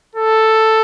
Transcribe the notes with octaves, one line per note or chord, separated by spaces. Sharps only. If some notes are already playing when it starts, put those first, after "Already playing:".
A4